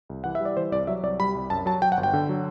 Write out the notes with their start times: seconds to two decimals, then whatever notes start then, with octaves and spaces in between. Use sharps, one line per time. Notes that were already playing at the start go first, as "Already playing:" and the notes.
0.09 C2
0.24 E3 F#5
0.35 E5
0.40 G3
0.45 D5
0.57 E3 C5
0.72 C2 D5
0.87 F#3 E5
1.03 C2 D5
1.19 G3 B5
1.35 C2
1.50 F#2 A5
1.66 F#3 A5
1.81 F#3 G5
1.92 F#5
1.97 G1
2.03 G5
2.13 D3
2.29 F#3